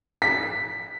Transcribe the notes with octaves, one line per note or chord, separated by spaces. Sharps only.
B6